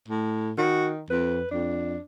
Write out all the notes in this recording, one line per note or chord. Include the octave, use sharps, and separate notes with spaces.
A2
D#3 F#4
F2 B4
F2 D4